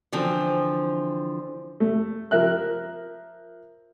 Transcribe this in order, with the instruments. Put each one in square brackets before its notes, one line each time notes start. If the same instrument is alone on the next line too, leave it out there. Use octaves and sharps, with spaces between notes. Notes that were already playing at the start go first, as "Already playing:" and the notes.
[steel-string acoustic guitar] D3 E3 F3 C4
[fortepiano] A3
F3 A#4 E5 F#6